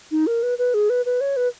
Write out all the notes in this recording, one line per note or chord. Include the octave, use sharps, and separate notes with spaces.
D#4
A#4
B4
B4
G#4
B4
B4
C#5
B4